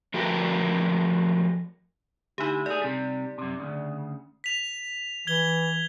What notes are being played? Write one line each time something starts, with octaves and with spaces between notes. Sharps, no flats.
F3 A3 F#4 A#4 B4 G5
D2 D#4 E4 G4
A3 G#4 D5
C3 G3
F#2 C3
D2 G#2 C#3
B6 F7
E3 G#6 G7